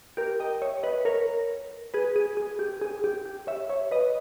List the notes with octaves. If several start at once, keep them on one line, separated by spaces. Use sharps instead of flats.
G4 A#4
D#5 G5
C#5 E5
B4 D#5
A#4 C#5
G#4 B4
G#4
G#4
G4
G#4
G4
G4
C#5 E5
C#5 E5
B4 D#5